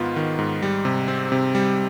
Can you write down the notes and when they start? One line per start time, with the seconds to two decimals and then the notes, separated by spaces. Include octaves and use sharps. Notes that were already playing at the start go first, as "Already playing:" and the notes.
Already playing: G#2 D#3 B3 F4
0.16 D#3
0.39 G#2
0.62 G3
0.85 C3
1.08 C4
1.32 C3
1.55 G3